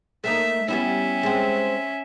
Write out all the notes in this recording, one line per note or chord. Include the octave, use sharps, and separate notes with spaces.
A3 A#3 D#4 E5
G3 B3 C#4 E4 E5
G#3 C4